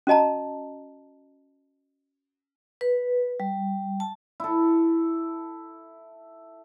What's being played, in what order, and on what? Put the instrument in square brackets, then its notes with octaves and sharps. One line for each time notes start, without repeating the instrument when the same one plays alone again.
[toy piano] C#4 F#4 D#5 A5 A#5
[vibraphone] B4
G3
A5
[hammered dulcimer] E4 A4